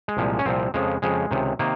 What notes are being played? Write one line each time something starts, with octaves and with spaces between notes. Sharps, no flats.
G#3
C2 A#2 F3
C#4
C2 A#2 F3 C4
F2 C#3 F3 G#3
F2 C#3 F3 G#3
C#2 C3 D#3
C3 D#3 A#3